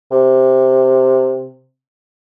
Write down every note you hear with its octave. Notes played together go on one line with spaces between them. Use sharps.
C3